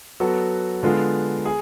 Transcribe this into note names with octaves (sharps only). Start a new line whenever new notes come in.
F#3 B3 F#4 A4
D3 G#3 B3 F4
G#4